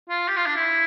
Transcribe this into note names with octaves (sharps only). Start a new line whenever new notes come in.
F4
G4
F4
D4
E4